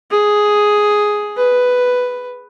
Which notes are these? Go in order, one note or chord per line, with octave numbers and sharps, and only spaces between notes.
G#4
B4